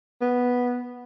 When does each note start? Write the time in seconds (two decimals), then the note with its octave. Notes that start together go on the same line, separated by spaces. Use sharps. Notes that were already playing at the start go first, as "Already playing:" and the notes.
0.21 B3